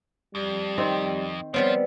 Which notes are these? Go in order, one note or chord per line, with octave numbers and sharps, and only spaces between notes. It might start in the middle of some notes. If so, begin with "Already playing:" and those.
F2 G3
D#3 C4
F3 G3 B3 C4 C#5